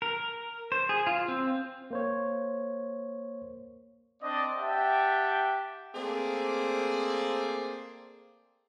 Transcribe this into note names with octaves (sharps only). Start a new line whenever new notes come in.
A#4
C5
G#4
F4
C4
A#3 C5 C#5
C4 D4 D5 D#5
G4 E5 F#5 G5 A5
A3 A#3 C4 G#4 C5 D5